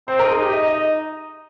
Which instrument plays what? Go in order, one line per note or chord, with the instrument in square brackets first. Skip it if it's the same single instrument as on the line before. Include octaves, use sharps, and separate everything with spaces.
[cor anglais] C4 [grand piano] C5
[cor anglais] D#4 [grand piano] A#4
[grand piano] G#4
[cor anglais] D#4 [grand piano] G4
[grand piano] D#5
D#5